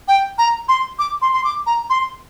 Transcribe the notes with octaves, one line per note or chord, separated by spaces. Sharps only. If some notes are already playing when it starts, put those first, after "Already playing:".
G5
A#5
C6
D6
C6
C6
D6
A#5
C6